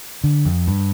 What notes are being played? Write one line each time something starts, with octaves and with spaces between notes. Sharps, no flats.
D3
F2
G2